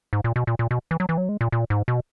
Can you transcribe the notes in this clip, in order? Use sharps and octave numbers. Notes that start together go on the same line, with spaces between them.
G#2
A#2
B2
A#2
A#2
B2
E3
F#3
E3
F#3
G#3
A#2
A#2
G#2
B2